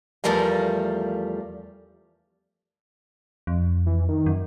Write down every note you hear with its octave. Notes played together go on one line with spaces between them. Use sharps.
E2 F3 G3 A3 A#4 F5
F2
E3
D#3
F#2